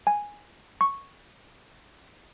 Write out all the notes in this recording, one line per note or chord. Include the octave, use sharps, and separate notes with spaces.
G#5
C#6